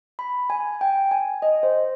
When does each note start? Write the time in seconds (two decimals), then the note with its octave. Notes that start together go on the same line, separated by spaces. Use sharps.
0.19 B5
0.50 G#5
0.81 G5
1.11 G#5
1.42 D#5
1.63 C5